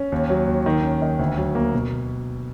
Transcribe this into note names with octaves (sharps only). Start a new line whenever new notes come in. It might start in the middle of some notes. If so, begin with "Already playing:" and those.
Already playing: C#4
D#2
F#3
D#2
D#3
C#4
D#3
D2
F#3
A#3
B2